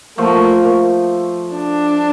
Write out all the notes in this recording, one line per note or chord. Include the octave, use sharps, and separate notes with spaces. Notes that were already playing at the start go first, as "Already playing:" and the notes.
F3 A3 A#3
D4